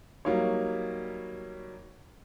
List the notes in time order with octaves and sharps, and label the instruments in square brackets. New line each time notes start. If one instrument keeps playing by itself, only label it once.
[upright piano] F#3 G3 A#3 D#4 C#5